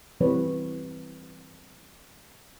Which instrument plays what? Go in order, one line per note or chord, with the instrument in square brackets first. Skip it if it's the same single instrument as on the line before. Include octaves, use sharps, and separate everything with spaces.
[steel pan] E3 G3 C4 B4 C#5